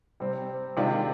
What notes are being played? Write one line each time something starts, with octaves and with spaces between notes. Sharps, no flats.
C3 G3 C4
C3 D#3 G#3 D4 F4